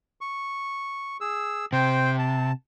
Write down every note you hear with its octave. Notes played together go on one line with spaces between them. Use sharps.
C#6
G#4 E6
C3 C5 G5
A5